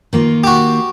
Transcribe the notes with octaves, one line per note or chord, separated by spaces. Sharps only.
D#3 A#3 F4
F#4 G4